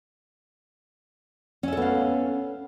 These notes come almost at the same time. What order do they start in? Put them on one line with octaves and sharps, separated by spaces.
C#4 E5 A4 B3 F5